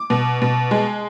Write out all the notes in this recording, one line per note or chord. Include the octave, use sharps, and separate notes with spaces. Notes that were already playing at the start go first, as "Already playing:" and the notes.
Already playing: D6
B2
B2
G#3